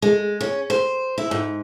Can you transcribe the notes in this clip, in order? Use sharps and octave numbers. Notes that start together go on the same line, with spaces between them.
G#3
C#4
C5
E4
G#2